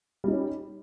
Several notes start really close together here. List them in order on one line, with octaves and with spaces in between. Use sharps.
G3 D#4 C#4